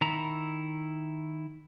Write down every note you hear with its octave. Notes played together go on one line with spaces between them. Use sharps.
D#3 E4 A#5